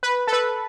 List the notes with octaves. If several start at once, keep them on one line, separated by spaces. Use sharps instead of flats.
B4
A4
B4